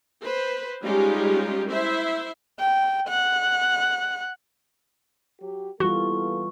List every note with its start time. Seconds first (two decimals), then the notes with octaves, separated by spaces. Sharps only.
0.23 B4 C5
0.84 G3 G#3 C#4 D#4 F4 G4
1.71 E4 C5 E5
2.59 G5
3.08 F#5
5.41 F#3 G4
5.80 E3 G3 A#3 B3 F4 F#4 A4 C#6